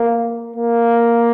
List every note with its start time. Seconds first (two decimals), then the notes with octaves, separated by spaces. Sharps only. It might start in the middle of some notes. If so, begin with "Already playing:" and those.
Already playing: A#3
0.56 A#3